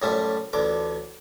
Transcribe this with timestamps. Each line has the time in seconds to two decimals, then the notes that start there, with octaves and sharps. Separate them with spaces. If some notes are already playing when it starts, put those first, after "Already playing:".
0.02 F#2 A2 F3 G3 A3 A5
0.53 A1 D2 D3 D6